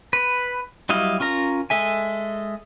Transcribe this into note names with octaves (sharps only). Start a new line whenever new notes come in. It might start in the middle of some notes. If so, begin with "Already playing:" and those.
B4
F#3 G3 E4 D#5 F5
C#4 F4 A#4 A#5
G#3 A4 E5 G#5